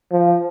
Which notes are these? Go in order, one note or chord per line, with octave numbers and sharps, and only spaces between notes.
F3